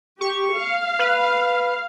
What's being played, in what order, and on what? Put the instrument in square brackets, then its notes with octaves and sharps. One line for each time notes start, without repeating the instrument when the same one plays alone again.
[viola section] G4 [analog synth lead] C#6
[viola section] F5
[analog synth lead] B4